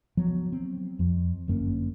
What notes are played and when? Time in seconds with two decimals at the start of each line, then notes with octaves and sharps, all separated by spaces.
0.17 F3 F#3 B3
0.52 C4
0.99 F2 F3
1.48 G1 F#2 A#3 C#4